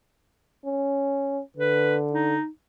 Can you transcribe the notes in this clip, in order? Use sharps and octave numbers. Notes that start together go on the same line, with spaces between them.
C#4
D3 B4
D#4